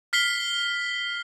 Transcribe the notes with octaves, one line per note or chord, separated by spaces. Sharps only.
F6 B6 C7 G7